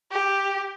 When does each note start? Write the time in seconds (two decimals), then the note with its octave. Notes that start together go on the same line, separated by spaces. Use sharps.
0.12 G4